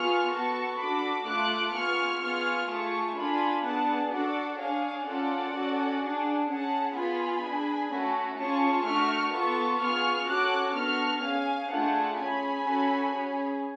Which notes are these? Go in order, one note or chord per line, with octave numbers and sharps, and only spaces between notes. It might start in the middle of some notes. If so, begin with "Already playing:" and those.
Already playing: B3 F4 G#4 C#6 F6
B3 F#4 A4 A5 C#6
D4 F#4 A4 B5 D6
A3 F4 A4 D6 F#6
B3 F4 G#4 C#6 F6
B3 F4 G#4 C#6 F6
A3 F4 G#4 A5 C#6
D4 F4 A4 G#5 B5
B3 D4 G#4 F#5 A5
D4 F#4 A4 D5 F#5
D4 G#4 C#5 F5
C#4 F4 A4 D5 F#5
C#4 F#4 A4
D4 G#4
C#4 G#4 F#5 A5
B3 F4 G#4 G#5 B5
D4 G#4
A3 C#4 F#4
C#4 F4 G#4 A5 C#6
A3 D4 F#4 C#6 F6
B3 F4 A4 A5 C#6
B3 F4 G#4 C#6 F6
C#4 F#4 A4 D6 F#6
B3 D4 F#4 A4 C#6 F6
C#4 G#4 F5 G#5
A3 D4 F4 G#4 F#5 A5
C#4 G#4 G#5 B5
C#4 F#4 A4
C#4 G#4